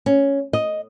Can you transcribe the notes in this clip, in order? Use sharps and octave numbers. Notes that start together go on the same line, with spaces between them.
C#4
D#5